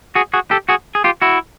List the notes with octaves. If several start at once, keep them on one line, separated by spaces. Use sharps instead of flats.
F#4 G#4
F#4 G#4
G4 A4
F#4 G#4
G#4
F4 G4
E4 F#4